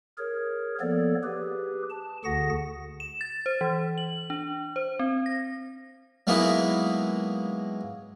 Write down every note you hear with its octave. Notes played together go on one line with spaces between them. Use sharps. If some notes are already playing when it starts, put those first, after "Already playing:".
G#4 A#4 C#5
F3 A#3 B3 A4 C#5 D5
G4 G#4 B4
A5
D2 D3 F#4 G#4 F#5 A#6
E7
A6
C5
E3
F#7
D4
C5
C4
A#6
F#3 G#3 A#3 B3 D#4 E4